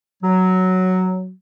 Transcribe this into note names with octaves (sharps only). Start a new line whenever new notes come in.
F#3